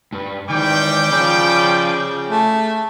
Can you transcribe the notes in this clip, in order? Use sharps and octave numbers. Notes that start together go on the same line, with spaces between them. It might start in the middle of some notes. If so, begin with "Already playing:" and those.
G2
D#3 E3 G3 G#3 G5 D6
F3 G#4 C#5
A3